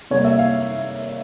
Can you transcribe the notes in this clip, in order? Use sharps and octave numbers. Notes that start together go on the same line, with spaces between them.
C3 G3 A#3 C#5
E5
F5